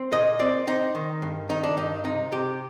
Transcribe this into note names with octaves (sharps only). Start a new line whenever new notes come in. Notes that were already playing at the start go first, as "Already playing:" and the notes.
Already playing: C4
A#2 D#5
C4 D5
C4 D#4
D#3
G2
D#3 D#4
D4
G2 D#4
C3 D#4
C3 G4